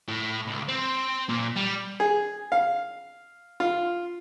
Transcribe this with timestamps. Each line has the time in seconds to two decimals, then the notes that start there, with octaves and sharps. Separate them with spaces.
0.08 A2
0.47 C#2
0.69 C4
1.29 A#2
1.56 G3
2.00 G#4
2.52 F5
3.60 F4